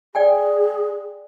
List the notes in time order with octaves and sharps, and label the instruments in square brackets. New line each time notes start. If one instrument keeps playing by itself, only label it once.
[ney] G#4 [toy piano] D5 G5 G#5